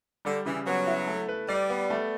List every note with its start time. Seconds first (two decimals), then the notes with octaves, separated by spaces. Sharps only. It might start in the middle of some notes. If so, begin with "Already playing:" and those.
0.25 D3 G3
0.46 C#3 E3
0.67 F#3 B3
0.87 E4
1.07 A3
1.28 B4
1.49 G3 D5
1.70 B3
1.90 A3